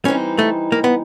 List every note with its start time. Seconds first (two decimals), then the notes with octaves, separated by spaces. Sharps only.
0.05 E3 G3 C4 C#4 D#4
0.39 A3
0.72 A#3
0.84 B3